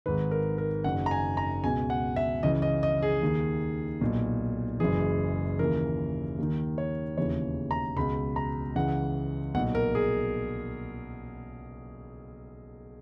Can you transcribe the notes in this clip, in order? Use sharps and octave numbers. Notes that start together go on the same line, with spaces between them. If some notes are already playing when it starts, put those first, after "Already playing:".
G#1 G#2 D#3 B4
A#4
A#4
F#1 F#2 D#3 F#5
A#5
G#5
A#5
C#2 B2 G#5
F#5
E5
C#2 C#3 E3 D#5
D#5
D#5
G#4
D#2 D#3
B1 A#2
F#1 F#2 E3 G#4
D#2 C#3 E3 A#4
D#2 D#3
C#5
E1 D#2 C#3 E3 C#5
A#5
C#2 B2 B5
A#5
C#2 C#3 E3 F#5
B1 A#2 F#5
A#4
G#4